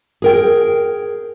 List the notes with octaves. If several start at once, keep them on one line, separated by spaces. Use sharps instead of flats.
G#4 A#4 G5